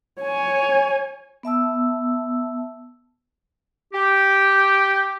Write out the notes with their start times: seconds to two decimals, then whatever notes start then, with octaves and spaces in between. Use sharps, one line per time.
0.22 C#5 G#5
1.43 B3 E5 A5 E6
3.93 G4